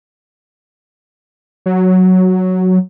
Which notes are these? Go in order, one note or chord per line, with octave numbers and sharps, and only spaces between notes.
F#3